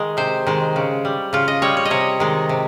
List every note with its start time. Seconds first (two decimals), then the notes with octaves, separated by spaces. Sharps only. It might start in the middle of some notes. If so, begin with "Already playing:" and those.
Already playing: D#3 G#3
0.17 C3 C5
0.47 D#3 G#3
0.76 C#3
1.05 G3
1.33 C#3 F4
1.48 D#5
1.62 G3 C#5
1.77 C#5
1.85 D#5
1.90 C3 C#5
2.20 D#3 G#3
2.49 C3